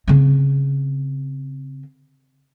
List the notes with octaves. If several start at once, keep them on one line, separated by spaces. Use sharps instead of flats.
C#3 C4